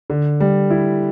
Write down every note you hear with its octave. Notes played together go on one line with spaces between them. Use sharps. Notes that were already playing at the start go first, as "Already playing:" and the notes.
D3
G3
E4